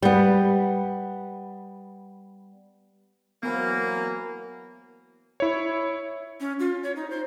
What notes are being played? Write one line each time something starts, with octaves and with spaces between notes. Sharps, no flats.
G3 B3
E3 F#3 A#3 B3 A#4 C5
E4 C#5
C#4
F4
C#5
D#4
C5